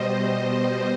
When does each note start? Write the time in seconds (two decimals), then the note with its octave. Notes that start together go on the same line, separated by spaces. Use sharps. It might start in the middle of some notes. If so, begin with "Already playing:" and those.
Already playing: B2 G3 C5 D#5